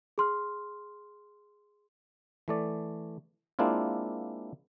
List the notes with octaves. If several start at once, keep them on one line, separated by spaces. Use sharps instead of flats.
G#4 C6 F6
E3 A3 D5
G#3 A#3 C4 D4 E4 F4